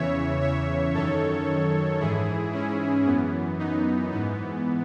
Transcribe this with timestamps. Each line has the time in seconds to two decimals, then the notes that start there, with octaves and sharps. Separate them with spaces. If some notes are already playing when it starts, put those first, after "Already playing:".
Already playing: E2 C#3 E3 C#5 E5
0.41 C#5 E5
0.94 F#2 D#3 A4 C#5
2.00 G#2 E3 E4 G#4
2.53 C#4 E4
3.06 F#2 E3 B3
3.59 B3 D#4
4.12 G#2 E3 B3